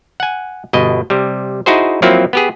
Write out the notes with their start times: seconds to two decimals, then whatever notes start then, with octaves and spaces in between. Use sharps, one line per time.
0.20 F#5 G#5
0.73 G1 B2 D#5
1.10 C3 G3
1.66 D#4 E4 F#4 G#4 C5
2.02 F3 F#3 A#3 C4 E4 F4
2.33 B3 G4 G#4